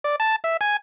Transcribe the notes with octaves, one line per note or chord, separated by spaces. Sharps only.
D5
A5
E5
G#5